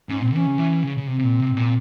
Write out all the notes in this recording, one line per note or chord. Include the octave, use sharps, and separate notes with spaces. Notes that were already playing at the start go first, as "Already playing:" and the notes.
G#2 C#4
A#2 C4
E3 C#4
C#3
E3
C#3
C#3
C3 C4
C3
A#2
C3
G#2
A#2